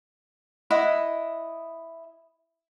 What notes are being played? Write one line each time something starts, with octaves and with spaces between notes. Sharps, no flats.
E4 D#5 F#5